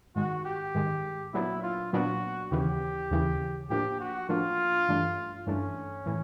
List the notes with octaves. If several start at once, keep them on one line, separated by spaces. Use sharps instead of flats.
G#2 D#3 G#3 F#4
G4
G#2 D#3 G#3
A#2 F#3 B3 D4 E4
F4
A#2 F#3 B3 D4 F#4
D#2 C#3 E3 G4
D#2 C#3 E3
A2 F3 A#3 D4 G4
F#4
A2 F3 A#3 D4 F4
G2 E3 A3 D4
G2 E3 A3 C#4 D4
A2 E3